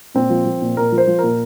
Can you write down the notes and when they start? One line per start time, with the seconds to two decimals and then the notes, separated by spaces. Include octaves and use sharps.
0.15 A#2 C4
0.30 F3
0.46 F3
0.62 A#2
0.77 A#2 A#4
0.92 F3
0.98 C5
1.07 F3
1.19 A#2 A#4